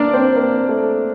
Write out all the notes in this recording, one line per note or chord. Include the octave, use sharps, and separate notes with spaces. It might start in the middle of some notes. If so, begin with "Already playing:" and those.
Already playing: A#3 D4 A#4 D5
C4 C5
A#3 A#4
A3 A4